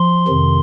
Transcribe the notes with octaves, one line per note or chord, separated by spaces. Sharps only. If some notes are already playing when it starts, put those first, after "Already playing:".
Already playing: F3 C6
F2 C3 D#3